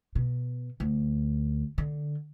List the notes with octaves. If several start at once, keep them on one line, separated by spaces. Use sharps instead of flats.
B2
D2
D3